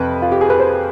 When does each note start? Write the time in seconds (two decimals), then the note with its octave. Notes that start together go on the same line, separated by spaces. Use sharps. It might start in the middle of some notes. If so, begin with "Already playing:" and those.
Already playing: F2 C3 B4
0.22 F4
0.32 G4
0.41 G#4
0.50 B4
0.60 C5